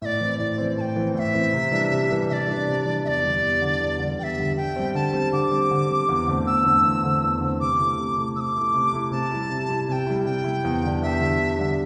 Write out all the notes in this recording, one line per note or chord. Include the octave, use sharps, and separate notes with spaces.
A2 D5 E5
E3 C4
A2 D5
E3 C4
A2 G5 A5
E3 C4
A2 E5 G5
E3 C4
C3
E3 G3 D4
C3
E3 G3 D4
C3 D5 E5
E3 G3 D4
C3
E3 G3 D4
E2 D5 E5
D3 G3
E2
D3 G3
E2
D3 G3
E2 E5 G5
D3 G3
D3 G5
G3 C4
D3 A5
G3 C4
D3 D6
G3 C4
D3
G3 C4
E2
D3 A3 C4
E2 E6
D3 A3 C4
E2
D3 A3 C4
E2
D3 A3 C4
C3 D6
A3 E4
C3
A3 E4
C3 D6 E6
A3 E4
C3
A3 E4
C3 A5
G3 E4
C3
G3 E4
C3 G5 A5
G3 E4
C3 G5
G3 E4
E2
D3 G3 D4
E2 E5
D3 G3 D4
E2
D3 G3 D4